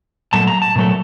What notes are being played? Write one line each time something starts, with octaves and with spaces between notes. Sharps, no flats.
A#2 F#3 A3 A5
A#5
A5
A#2 F#3 A3